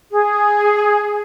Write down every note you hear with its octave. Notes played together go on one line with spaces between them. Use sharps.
G#4